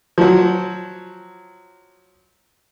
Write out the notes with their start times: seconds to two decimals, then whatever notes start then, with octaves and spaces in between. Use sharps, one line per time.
0.18 F3 F#3